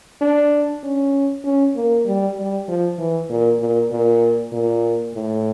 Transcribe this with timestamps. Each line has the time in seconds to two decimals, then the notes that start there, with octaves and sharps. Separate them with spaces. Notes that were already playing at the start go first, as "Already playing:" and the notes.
0.21 D4
0.83 C#4
1.44 C#4
1.75 A#3
2.05 G3
2.36 G3
2.68 F3
2.98 E3
3.29 A#2
3.59 A#2
3.91 A#2
4.52 A#2
5.14 A2